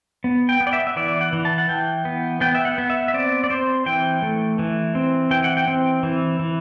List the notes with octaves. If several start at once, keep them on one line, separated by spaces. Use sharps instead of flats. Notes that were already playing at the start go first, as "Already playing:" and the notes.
B3
G5
B3
D5
E5
E5
E3 D5
F#5
E3
A5
F#5
E3 G5
B3
B3 G5
E5
F#5
B3
E5
E5
C4 D5
D5
C4 C5
E3 G5
A3
E3
C4
E3 G5
F#5
G5
C4
E3
E3